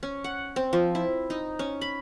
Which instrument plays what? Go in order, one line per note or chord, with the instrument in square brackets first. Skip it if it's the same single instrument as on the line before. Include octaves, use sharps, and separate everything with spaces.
[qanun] C#4
F#5
C4
F3
E4
D#4
C#4
B5